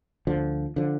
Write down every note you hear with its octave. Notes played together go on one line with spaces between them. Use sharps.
D2 D3 F3
D3 F3